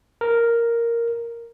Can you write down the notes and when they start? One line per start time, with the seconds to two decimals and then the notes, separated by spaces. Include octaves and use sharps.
0.21 A#4